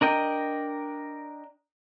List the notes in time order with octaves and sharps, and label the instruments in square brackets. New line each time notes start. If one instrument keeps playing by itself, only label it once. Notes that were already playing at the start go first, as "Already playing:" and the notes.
[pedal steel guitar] D4 A#4 D#5 G5